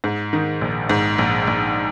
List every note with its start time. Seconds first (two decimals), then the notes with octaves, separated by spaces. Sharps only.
0.04 G#2
0.33 D#3
0.61 A#1
0.89 G#2
1.18 A#1
1.47 A#1